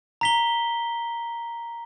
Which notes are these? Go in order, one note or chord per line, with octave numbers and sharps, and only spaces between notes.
A#5 B6 G7